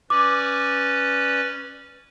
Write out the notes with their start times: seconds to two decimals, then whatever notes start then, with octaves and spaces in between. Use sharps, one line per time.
0.10 C#4 B4 D5 D6